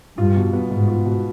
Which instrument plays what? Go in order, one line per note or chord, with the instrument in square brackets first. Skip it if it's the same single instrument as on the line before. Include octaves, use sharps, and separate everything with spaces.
[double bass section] G2 [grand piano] F4
[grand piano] B2
B3
[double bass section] G#2 [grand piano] B2
[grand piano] F4
B2